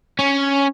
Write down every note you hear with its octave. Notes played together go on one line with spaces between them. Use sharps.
C#4